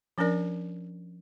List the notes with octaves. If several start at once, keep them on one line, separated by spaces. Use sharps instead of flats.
F3 C#4 D4 A#4 D5